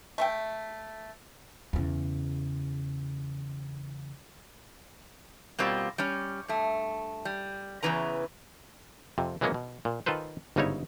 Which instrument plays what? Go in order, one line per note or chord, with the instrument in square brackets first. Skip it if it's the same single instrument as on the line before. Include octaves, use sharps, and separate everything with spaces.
[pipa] A3 E5 G5
[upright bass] E2 C#3
[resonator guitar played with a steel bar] B2 G3 A#3 C4 F4
G3 C#4
G2 A3
G3
E2 G2 C#3 E3 B4 A#5
[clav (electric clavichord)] F2 C3
E3 F#3 G#3 A#3 B3 C#4
B2
A#2
D#3 F4 A4 B4 C5
G1 G#2 C#3 D#4 E4 C#5